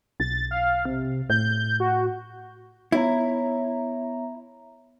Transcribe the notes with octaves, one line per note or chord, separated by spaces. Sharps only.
B1 A6
F5
C3
A2 G6
F#4
B3 E4 C#5 A#5